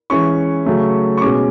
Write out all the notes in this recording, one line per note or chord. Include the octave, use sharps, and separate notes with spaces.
E3 G#3 C#4 C#6
C#3 F#3 A3 C#4
C#6
B2 G#3 C#4 D6